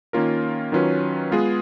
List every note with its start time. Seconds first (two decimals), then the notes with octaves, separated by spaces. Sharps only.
0.13 D#3 A#3 C#4 F4 A#4
0.72 D#3 F#3 C#4 F4 B4
1.31 G#3 B3 F4 G#4